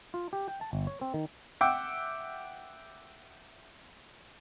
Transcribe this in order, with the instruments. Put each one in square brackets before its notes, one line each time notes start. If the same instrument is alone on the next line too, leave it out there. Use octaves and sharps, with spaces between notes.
[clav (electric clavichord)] F4
G4
G5
A5
G1
C#5
C4
D#3
[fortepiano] E5 F#5 G5 D6 E6